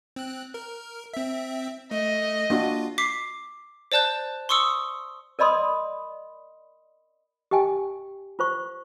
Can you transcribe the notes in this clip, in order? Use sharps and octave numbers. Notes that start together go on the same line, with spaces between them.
C4 F#6
A#4
C4 E5
A3 D#5
A#3 D4 F4 F#4
D6 B6 C7
C5 D5 A5 F#6 G6
C6 C#6 D#6 E6 C#7
A#4 D5 D#5 B5 C6 D#6
G4 D#5 G5 G#5
F4 C5 C#6